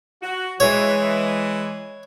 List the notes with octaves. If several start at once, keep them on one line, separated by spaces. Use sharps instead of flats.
F#4
E3 G#3 C#5